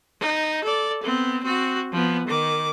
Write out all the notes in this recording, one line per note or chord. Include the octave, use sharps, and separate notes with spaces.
D#4
A4 D5
B3 C4
C4 F#4
F3 B3
D#3 D6